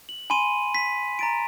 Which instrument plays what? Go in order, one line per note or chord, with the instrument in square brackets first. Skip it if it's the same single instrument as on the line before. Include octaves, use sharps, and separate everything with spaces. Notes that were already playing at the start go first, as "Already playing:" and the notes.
[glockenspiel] F#7
G#5 B5 C6 D#7
B6
A#5 A6 D7